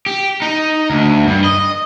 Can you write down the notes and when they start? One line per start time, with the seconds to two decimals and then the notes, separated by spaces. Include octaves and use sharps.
0.06 G4
0.42 D#4
0.90 D2
1.27 G2
1.44 D#5